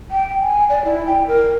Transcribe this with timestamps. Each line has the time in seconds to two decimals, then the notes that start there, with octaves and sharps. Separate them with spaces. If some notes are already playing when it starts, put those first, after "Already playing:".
0.11 G5
0.40 G#5
0.69 D5
0.85 E4
1.06 G5
1.27 A#4